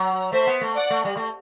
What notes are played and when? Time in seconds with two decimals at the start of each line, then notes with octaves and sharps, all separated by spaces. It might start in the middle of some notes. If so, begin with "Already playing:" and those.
Already playing: F#3
0.32 A3 C5 E5
0.47 B3
0.61 A3
0.76 D5 F#5
0.90 A3
1.05 G3
1.17 A3